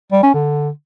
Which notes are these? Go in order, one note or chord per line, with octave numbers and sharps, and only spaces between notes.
G3
C#4
D3